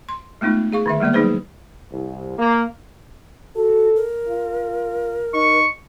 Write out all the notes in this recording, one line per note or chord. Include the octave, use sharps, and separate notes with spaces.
C6
G#3 A3 B3 D#4 F4
G#4 F5 C#6
D3 D#3 E5
G3 G#3 A#3 B3 D5
F#3 G3 D#4 G#4 B4 C5
C2
A#3
F#4 A4
A#4
F4
D#4 C#6